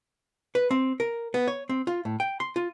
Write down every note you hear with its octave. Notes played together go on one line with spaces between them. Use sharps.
B4
C4
A#4
B3
C#5
C4
F4
A2
G5
C6
F4